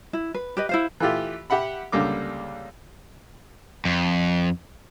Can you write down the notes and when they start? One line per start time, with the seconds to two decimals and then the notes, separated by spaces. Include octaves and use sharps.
0.13 E4
0.34 B4
0.57 G4 B4 D#5
0.69 E4 C5 F5
1.00 E3 A3 E4 F4 G4
1.50 G4 E5 F#5 B5
1.92 C#2 D3 G3 A#3 D6
3.85 F2